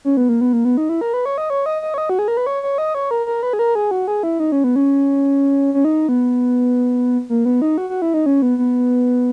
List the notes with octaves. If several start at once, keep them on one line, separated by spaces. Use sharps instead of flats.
C#4
B3
A#3
B3
A#3
B3
D#4
E4
A#4
B4
C#5
D#5
C#5
D#5
D#5
C#5
D#5
F#4
G#4
A#4
B4
C#5
C#5
D#5
C#5
A#4
A#4
B4
G#4
A#4
G#4
F#4
G#4
E4
D#4
C#4
B3
C#4
C#4
D#4
B3
A#3
B3
D#4
F#4
F#4
E4
D#4
C#4
B3
B3